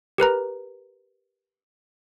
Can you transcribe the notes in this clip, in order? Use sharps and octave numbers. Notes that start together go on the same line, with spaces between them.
G4 A#4 B4 A#5